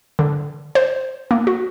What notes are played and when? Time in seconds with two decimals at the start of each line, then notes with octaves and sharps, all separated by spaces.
0.19 D3
0.75 C5
1.31 A#3
1.47 F#4